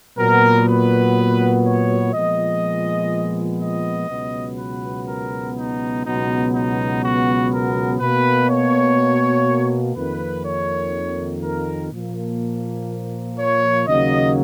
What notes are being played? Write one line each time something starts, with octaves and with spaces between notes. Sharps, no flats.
A#2 F#3 B3 A#4
B4
C#5
A#2 F3 G#3 B3 D#5
D#5
C#2 B2 F#3 B3
B4
A#4
D#4
C#2 B2 F#3 B3 D#4
D#4
F#4
A#4
B2 A#3 B4
C#5
F2 D#3 A#3 B4
C#5
A#4
A#2 F3 A#3
C#5
D#2 C#3 F#3 A#3 D#5